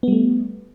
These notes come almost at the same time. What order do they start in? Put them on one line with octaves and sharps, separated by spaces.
B3 G3 A3